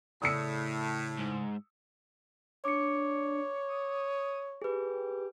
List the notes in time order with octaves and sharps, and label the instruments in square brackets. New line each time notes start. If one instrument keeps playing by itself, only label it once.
[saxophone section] A2 [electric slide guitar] C#3 D5 [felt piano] D#6 E6 C#7
[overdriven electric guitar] G#2
[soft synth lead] D4 [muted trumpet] C#5 [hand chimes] D6 C#7
[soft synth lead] D#6
[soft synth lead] G4 [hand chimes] G#4 B4